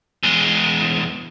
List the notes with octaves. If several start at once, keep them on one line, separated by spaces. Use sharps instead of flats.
E2 G#3